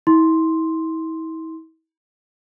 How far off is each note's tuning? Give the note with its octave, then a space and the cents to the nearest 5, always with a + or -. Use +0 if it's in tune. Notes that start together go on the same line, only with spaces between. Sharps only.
E4 -40 C6 +0